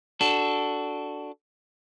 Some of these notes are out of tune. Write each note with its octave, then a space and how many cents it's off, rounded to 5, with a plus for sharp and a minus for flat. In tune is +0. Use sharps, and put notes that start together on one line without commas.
D4 +0 F#4 +10 A4 +0